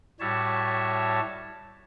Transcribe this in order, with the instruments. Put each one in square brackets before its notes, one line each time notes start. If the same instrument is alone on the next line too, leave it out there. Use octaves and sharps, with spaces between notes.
[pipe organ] A2 G3 F#4 C#5 E5 A5